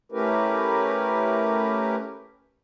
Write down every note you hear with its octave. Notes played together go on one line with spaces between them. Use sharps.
A3 C#4 E4 G4 A#4 B4